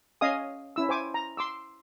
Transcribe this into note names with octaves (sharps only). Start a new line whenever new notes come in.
C#4 D#5 F5 G#5 D#6
C#4 E4 E6
C5 G#5 D6
A#5
C6 D6 E6